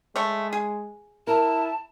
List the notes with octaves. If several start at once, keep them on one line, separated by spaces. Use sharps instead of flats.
G#3 A3 C#5
G#4
E4 A#4 A5